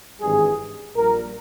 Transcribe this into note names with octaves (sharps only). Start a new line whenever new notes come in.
G#1 G2 E3 G3 G#4
A#1 A#2 G3 A#4